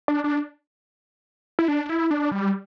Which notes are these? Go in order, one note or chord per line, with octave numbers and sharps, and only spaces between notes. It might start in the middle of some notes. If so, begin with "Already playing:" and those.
D4
D4
E4
D4
E4
D4
G3